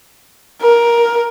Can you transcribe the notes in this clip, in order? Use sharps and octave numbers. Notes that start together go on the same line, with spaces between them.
A#4